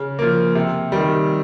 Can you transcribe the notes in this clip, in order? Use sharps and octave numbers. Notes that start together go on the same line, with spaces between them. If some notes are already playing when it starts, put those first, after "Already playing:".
Already playing: C#3
F3 A#3
C3
D#3 G3